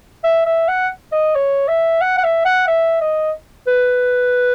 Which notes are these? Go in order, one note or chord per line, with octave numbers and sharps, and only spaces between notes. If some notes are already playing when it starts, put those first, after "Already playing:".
E5
E5
F#5
D#5
C#5
E5
F#5
F#5
E5
F#5
E5
D#5
B4